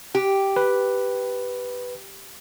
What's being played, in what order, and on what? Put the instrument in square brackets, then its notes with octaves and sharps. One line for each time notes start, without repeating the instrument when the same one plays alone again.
[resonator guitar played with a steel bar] G4
[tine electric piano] B4